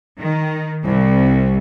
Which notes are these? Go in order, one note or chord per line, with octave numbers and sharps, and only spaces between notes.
D#3
C2